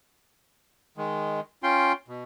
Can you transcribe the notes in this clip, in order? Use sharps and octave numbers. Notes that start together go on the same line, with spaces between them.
D#3 G#3
C#4 F4 G5 C6
B2